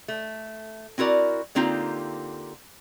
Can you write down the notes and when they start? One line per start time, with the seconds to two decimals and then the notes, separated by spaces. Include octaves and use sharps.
0.08 A3
0.98 C4 E4 F#4 A#4 D5
1.55 D3 A#3 C4 D#4 F4 G4